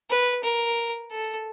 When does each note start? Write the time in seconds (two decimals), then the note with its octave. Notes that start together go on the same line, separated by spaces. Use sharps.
0.10 B4
0.43 A#4
1.11 A4